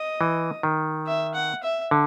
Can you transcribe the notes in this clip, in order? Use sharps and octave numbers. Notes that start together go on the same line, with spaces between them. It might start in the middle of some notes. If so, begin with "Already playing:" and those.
Already playing: D#5
E3
D#3
E5
F#5
E5
D3